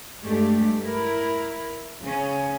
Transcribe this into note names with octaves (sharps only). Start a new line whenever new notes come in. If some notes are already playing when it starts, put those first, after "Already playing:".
G2 G#3 A3 D4 G4
E4 A#4
C#3 C#4